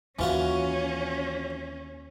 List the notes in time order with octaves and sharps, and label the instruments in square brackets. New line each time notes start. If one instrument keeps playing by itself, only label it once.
[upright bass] D#2 [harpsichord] E3 F4 F#4 [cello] C#4